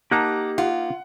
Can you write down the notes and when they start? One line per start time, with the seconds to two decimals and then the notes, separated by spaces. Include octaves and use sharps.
0.11 A#3 D#4 G4 F#5 A5 A#5 F#6
0.58 F4 F#5